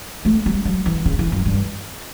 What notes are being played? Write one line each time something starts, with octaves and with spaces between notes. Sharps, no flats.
A3
G3
F#3
E3
C#3
E3
F#2
G2